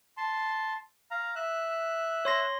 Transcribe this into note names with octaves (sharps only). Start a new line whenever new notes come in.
A5 C6
F5 A#5
E5 F#6
C#5 C6 A#6